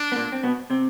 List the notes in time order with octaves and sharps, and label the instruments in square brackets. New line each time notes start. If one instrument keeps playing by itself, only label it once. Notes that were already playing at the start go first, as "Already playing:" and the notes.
Already playing: [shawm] D4
[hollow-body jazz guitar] B3
A#2 A#3
C4
B2 B3
C3 C4